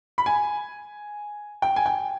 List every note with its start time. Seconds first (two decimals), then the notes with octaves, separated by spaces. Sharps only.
0.18 B5
0.26 G#5
1.62 G5
1.76 G#5
1.86 G5